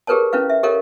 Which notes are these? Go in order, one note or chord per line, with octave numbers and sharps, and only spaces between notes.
G4 G#4 A#4 B4 C#5 A5
C#4 E4 B4 F5
E5
G4 A4 A#4 C#5 D#5 F5